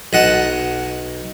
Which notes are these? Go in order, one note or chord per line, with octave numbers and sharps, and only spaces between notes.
B1 D#5 F#5 A5